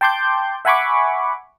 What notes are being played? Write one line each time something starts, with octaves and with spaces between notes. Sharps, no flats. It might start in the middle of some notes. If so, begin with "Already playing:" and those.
G5 A5 C6 D6 G6
E5 F#5 G#5 B5 C#6 D6